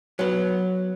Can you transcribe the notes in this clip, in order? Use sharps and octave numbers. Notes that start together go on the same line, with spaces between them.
F#3 B3